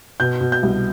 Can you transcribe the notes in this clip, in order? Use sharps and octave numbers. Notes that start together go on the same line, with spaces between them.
B2 G6
B2
G6
C2